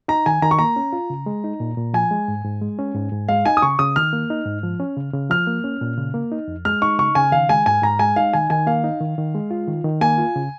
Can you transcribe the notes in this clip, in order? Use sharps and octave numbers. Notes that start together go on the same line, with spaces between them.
D#4 A#5
D#3 G#5
D#3 A#5
C#6
A#3 A#5
C#4
F4
C#3
G#3
D#4
A#2
A#2
F3 G#5
G#3
G#2
G#2
G#3
C#4
G#2
G#2
G#3 F5
D#4 G#5
D#6
C#3 C#6
C#3 D#6
D#3 F6
A#3
D#4
G#2
F3
C#4
C#3
C#3
F3 F6
A#3
C#4
A#2
C#3
A#3
D#4
F2
G#3 F6
D#4 C#6
C#3 C#6
C#3 G#5
D#3 F5
G#3 G#5
G#2 G#5
G#2 A#5
G#3 G#5
D#4 F5
D#3 G#5
D#3 G#5
A#3 F5
D#4
D#3
D#3
G#3
F4
D#3
D#3
A#3 G#5
F4
C#3